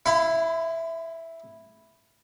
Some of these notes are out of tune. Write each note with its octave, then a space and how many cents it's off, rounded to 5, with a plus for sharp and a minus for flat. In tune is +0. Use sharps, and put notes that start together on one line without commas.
E4 +0 F5 -30 B5 +45